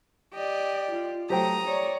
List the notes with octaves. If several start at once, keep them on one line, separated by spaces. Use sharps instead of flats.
G4 D5 D#5
F4
F#3 A3 G4 C5 G5 A#5 D#6
C#5 D5